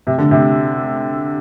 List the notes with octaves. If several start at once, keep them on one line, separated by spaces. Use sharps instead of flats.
C3
D3
C3